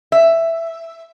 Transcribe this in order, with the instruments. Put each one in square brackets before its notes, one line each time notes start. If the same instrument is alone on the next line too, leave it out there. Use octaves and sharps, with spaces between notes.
[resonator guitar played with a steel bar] E5